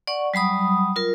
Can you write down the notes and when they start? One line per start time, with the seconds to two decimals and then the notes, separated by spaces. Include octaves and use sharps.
0.07 D5 F#5 C#6
0.34 F#3 G3 B5 D#6
0.96 F4 A#4